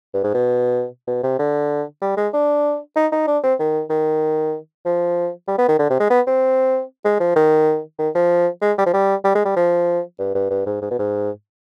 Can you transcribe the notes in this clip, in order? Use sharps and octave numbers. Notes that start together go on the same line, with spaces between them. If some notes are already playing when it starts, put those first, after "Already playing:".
G2
G#2
B2
B2
C3
D3
G3
G#3
D4
D#4
D#4
D4
C4
D#3
D#3
F3
G3
B3
D#3
D3
C3
G#3
B3
C4
G#3
F3
D#3
D#3
F3
G#3
G3
F3
G3
G3
G#3
G3
F3
G2
G2
G2
G#2
G#2
B2
G#2